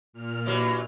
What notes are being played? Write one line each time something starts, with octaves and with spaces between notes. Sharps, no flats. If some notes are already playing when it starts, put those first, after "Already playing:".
A#2 F6
G2 E3 F#3